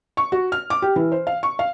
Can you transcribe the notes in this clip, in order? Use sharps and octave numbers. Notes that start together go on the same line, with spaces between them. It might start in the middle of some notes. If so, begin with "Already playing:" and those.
C#6
F#4
F6
D6
G4
E3
C5
F5
C#6
F5